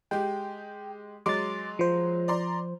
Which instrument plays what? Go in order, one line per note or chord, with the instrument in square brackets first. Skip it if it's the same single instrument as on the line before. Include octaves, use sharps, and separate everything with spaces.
[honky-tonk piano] G#3 G4 [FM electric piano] G5
[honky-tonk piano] F#3 G#3 C6 [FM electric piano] D6 A6
[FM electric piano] F3 C5
[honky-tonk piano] D5 A#5 C6